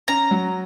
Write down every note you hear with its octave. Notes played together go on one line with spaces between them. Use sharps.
C#4 A#5
F#3